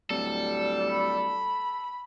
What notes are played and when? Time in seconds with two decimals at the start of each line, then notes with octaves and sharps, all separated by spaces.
0.10 D1 G3 A4
0.90 B5